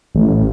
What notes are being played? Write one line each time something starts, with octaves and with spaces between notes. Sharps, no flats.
A1